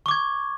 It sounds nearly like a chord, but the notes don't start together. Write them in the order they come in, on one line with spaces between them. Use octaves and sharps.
C#6 D6 G#6